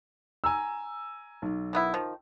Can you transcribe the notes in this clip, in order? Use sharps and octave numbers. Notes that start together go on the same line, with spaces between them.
G#5 A#5 E6
B1
D#3 B3 E4
D#3 F3